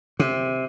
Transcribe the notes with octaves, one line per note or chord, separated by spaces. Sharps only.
C3